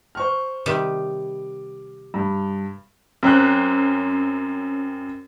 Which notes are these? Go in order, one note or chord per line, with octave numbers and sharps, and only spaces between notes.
C5 C#6 F6
C3 D#3 G3 D6
G2
F#2 C4 C#4 F#6